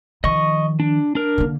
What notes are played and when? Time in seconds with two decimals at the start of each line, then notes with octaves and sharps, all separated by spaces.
0.24 D#3 F3 D#5 C#6
0.80 D4
1.15 D4 A#4
1.38 D3 A#3